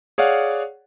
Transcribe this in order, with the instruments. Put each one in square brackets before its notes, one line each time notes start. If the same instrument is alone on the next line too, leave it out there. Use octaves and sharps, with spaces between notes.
[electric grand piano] G#4 C#5 D5 F5 F#5